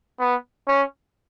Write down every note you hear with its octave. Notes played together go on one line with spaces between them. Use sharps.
B3
C#4